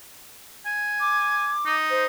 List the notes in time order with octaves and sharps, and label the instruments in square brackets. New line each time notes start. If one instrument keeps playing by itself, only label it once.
[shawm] G#5
[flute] D6
[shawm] D#4
[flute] C5